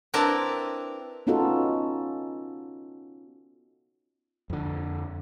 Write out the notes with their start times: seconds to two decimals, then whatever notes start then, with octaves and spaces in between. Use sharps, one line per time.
0.14 C4 D4 E4 A#4 B4 A5
1.27 B3 C#4 D#4 F4 F#4 A4
4.50 F2 D3